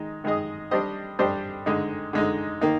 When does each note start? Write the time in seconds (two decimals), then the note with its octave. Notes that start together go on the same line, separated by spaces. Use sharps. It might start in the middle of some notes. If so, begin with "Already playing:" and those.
Already playing: D#3 G#3 D#4
0.24 D#3 G#3 D#4 G#4 D#5
0.71 G3 D4 G4 C5 D#5
1.19 G3 D4 G4 C5 D#5
1.66 D3 G#3 D#4
2.13 D3 G#3 D#4
2.61 D#3 A#3 D#4